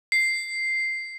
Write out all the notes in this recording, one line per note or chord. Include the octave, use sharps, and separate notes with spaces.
C7